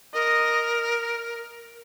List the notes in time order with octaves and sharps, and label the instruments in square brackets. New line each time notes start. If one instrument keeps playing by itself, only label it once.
[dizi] A#4 [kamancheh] D#5